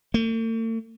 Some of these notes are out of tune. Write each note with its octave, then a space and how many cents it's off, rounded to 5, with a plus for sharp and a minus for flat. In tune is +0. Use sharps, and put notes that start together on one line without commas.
A3 +45